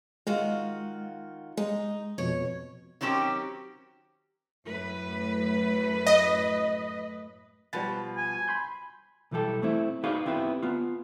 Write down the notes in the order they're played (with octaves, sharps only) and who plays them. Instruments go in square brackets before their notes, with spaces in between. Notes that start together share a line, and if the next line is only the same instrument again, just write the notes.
[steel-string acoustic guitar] D#3 F4 F#4 [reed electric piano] G#3
[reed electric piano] G#3 [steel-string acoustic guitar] D#4
[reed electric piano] F2 B2 [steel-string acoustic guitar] C#5
[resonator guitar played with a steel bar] D#3 F#3 C4 C#4 G4
[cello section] F#2 A2 B4
[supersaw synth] D#5
[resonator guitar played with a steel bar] B2 F3 [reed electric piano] G3 B4 A6
[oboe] G#5
[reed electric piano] B5 C6 G6
[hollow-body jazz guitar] B1 E3 G3 G4 A4
A3 C4 E4
D#4 F#4 G#4 B4 D5 F5
B3 C4 E4 G4 B4
B3 F4